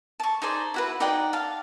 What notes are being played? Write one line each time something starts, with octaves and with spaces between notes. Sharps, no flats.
A5 C#6
D#4 G#4 C5 D5
E4 F#4 B4
D#4 D5 F#5 G5
F5 A5